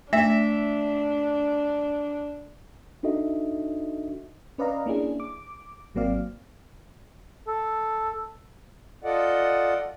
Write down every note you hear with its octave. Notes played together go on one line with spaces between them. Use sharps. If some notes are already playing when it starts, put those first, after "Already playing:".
A3 D4 E5
D4 D#4 F#4 A4 D#5 E5
C#4 B4 D5 D#5 F5 A#5
A#3 C#4 D4 E4 G#4
D6
G#1 F#3 A#3 C4 D5 F5
A4
F4 A4 D5 D#5 F#5